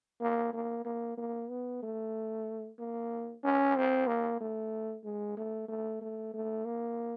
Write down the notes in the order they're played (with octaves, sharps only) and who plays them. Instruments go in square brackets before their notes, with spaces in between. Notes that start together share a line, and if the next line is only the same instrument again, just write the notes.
[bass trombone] A#3
A#3
A#3
A#3
B3
A3
A#3
C#4
C4
A#3
A3
G#3
A3
A3
A3
A3
A#3